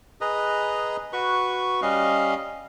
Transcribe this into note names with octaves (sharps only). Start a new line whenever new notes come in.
G#4 B4 D#5 A#5
F#4 B4 C#6
G3 C#4 D#5 F5